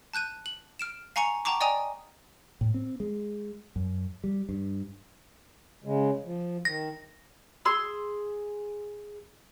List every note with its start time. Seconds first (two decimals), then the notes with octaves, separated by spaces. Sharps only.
0.13 A5 F#6 G6 D#7
0.46 F#7
0.79 F6 D7 E7
1.16 F5 G#5 A#5 C#6 C#7 F7
1.45 F#5 G5 A5 A#5 C#6 D6
1.60 D5 D#5 G5 G#5 A#5 D#6
2.61 A2
2.74 C4
3.00 G#3
3.76 F#2
4.24 G3
4.49 G2
5.84 C#3 G#3
6.25 F3
6.65 D#3 A#6
7.65 G#4 C6 E6